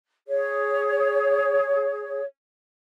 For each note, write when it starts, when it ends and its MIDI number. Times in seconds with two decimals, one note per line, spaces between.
0.27 2.22 68
0.27 2.22 73